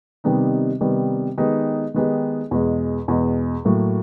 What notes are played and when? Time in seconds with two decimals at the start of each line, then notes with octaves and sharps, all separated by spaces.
0.24 C3 D#3 G3 B3 D#4
0.81 C3 D#3 G3 B3 D#4
1.38 D#3 G#3 B3 D#4 G4
1.94 D#3 G#3 B3 D#4 G4
2.51 E2 B2 G#3
3.08 E2 B2 G#3
3.65 A2 F#3 A#3